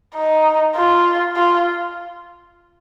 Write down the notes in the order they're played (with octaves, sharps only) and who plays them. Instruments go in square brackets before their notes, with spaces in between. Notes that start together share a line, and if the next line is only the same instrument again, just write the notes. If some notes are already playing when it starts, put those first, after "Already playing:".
[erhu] D#4
F4
F4